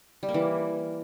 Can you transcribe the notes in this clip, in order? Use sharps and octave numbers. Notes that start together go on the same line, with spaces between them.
G3
A#3
E3